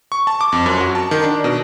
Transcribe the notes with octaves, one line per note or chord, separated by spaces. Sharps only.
C#6
A5
D6
F2
F#2
F#4
A5
D#3
D4
B2